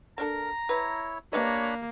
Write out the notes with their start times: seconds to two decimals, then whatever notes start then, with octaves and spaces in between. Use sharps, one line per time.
0.18 A#3 D4 A4 A#4 A#5
0.69 E4 B4 C#5
1.33 G3 A#3 D4 B4 C#5 D#5 A#5 B5